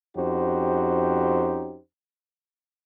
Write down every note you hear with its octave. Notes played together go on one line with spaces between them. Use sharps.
F2 C#4 D#4 F#4 G4 C5